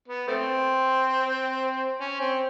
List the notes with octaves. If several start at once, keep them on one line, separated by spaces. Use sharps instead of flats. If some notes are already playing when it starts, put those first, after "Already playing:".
B3
A3 C4
C#4
C4